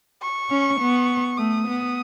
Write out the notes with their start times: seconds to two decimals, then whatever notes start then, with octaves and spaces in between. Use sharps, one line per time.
0.22 C#6
0.50 C#4
0.80 B3
1.37 A3 D#6
1.68 B3